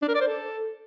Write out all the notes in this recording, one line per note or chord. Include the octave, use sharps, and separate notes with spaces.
D4
A#4
D5
C5
A4